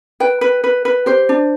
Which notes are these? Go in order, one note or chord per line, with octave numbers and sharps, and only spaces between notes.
B4 G5
B4
B4
B4
G4 C5
D4